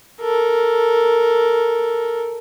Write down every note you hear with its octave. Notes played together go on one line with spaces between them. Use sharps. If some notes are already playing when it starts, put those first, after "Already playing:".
A4 A#4